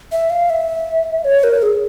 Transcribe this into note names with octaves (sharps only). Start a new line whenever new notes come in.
E5
F5
E5
C#5
A#4
G#4